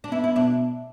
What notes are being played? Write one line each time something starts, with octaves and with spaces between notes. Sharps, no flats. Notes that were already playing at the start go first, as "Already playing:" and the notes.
D4
B3 E4
E4
B2 D4